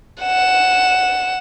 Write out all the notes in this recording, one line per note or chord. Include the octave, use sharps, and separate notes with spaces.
F#5 E7